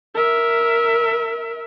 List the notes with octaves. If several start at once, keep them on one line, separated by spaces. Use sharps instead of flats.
A#4 E5